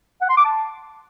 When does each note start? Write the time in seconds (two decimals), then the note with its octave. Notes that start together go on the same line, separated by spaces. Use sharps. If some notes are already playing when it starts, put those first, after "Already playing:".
0.22 F#5
0.29 C6
0.37 D6
0.45 A5